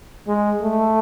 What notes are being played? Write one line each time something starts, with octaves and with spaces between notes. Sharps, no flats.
G#3
A3